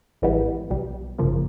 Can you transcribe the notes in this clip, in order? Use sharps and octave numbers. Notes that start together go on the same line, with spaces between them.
A1 G#2 E3 G3 B3
B1 B2 G3
G#1 F#2 C#3 F3 A#3